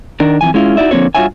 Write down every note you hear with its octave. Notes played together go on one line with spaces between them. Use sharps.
D#3 D4 A#4
F2 C#3 E3 G#5
G#3 C#4 E4 F4
D#4 E4 F#4 D5 E5
D3 F3 A#3 C4 F#4 C#5
G2 F4 F#4 C#5 E5 G#5